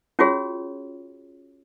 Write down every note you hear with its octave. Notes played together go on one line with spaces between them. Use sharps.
C#4 F4 F#4 G#4 C#5